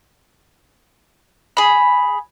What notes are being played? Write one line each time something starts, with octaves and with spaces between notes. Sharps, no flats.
G#4 B5